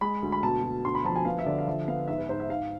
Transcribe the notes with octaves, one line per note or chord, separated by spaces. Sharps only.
G#3 B5
D2
B5
B2 A5
B2
D2 C6
B5
F3 A5
G#5
B3 F5
E5
D3 D5
F5
F3 E5
B3 F5
G#2 E5
B4
G#2 C5
E5
G#2 F5